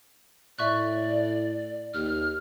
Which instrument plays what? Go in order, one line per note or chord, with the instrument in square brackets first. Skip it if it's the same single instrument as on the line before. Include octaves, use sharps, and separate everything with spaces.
[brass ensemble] A2 [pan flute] D5 [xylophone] E5 C#6 F#6
[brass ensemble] D#2 [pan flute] F6